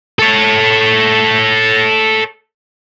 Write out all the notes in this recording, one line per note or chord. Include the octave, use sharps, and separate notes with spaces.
A4 C#5